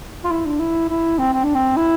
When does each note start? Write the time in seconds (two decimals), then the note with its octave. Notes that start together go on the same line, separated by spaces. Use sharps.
0.24 F4
0.31 E4
0.46 D4
0.60 E4
0.89 E4
1.18 C4
1.33 C4
1.44 D4
1.54 C4
1.76 E4